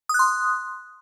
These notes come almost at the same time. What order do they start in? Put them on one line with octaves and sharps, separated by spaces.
D#6 F#6 C6